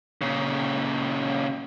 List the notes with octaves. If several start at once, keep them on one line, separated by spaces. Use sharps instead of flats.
A#2 C#3